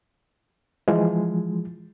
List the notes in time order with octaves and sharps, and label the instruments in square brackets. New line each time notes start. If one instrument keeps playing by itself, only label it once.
[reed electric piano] E3 F3 G#3